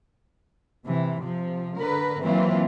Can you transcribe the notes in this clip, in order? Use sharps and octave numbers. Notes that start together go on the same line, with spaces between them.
C3 E3
C3 F3
D3 A#4 B4
E3 F#3 A#3 C4 F4